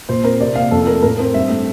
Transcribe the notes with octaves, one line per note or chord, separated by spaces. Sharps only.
A#2 C5
C4 A#4
C3 D5
A#3 F5
F2 A4
A4
A3 A#4
A2 A#4
C4
G2 E5
A3